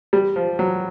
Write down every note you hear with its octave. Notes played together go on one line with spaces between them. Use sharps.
G3
F3
F#3